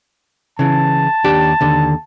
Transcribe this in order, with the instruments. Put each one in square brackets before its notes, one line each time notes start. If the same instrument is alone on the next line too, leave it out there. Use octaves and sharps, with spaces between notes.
[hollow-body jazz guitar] C#3 E3 [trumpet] A5
[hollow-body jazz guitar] D#2 D4 G4
D#2 D3